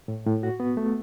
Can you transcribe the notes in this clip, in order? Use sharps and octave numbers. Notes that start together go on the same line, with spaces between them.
A2
A2
F#4
B3
A3